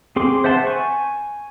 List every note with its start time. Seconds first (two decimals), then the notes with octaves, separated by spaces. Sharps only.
0.16 C4 G#4 C6 D6
0.44 C5 E5 F#5 A5 C6
0.67 G#5 C#6